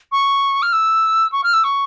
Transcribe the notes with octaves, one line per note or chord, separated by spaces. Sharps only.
C#6
F6
E6
C#6
F6
E6
C#6